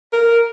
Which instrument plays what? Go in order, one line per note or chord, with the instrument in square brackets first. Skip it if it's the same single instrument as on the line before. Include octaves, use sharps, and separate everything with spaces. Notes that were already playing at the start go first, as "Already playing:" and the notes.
[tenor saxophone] A#4